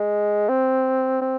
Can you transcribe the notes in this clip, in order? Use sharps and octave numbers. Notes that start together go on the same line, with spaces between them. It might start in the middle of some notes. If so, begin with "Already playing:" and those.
Already playing: G#3
C4
C4